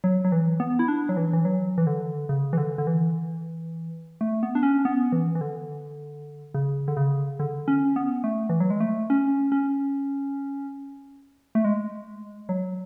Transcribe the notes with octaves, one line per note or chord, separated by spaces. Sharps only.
F#3
F#3
E3
B3
E4
D4
F#3
E3
E3
F#3
E3
D3
C#3
E3
D3
D3
E3
A3
B3
D4
C#4
B3
E3
E3
D3
C#3
D3
C#3
D3
C#4
B3
A3
E3
F#3
G#3
A3
C#4
C#4
A3
G#3
F#3